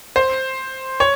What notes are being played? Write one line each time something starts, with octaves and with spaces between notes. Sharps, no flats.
C5
C#5